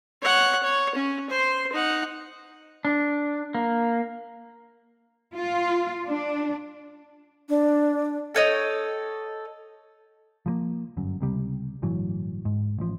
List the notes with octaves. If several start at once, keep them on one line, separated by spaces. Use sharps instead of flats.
C#5 F#5
C#5
C#4
C5 C6
D#4 F#5
D4
A#3
F4
D4
D4
A4 C#5 D#5 G5
F3 G3 A#3
G1 F#2
C#2 C3 G3
G1 A2 E3 F#3
G#2
A1 F3